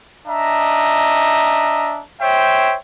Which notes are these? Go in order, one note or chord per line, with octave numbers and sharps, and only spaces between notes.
D4 D#5 E5 A#5
C5 C#5 E5 G5